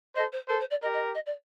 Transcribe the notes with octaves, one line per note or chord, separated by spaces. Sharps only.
A4 C5 D#5
C5
A4 A#4 C5
C5
D5
G4 A#4 D#5
D#5
D#5
D5